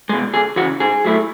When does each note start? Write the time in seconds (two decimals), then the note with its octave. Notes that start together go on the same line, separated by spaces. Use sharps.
0.09 B2 G#3
0.33 D2 G#4
0.56 E3 F#4
0.61 C#3
0.80 G#2 G#4
1.04 F#3 A3 E4